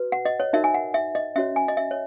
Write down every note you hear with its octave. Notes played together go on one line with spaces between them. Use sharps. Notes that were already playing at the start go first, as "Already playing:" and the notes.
Already playing: F#4 B4
F#5
D#5
C#5
D#4 F#4 A#4 C#5 E5
G#5
F#5
E5
D#5
C#4 F#4 C#5 E5
G#5
D#5
E5
C#5